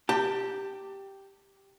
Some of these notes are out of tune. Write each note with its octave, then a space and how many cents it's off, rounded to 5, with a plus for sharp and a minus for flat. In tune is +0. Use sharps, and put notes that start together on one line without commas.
G4 +0 A5 +25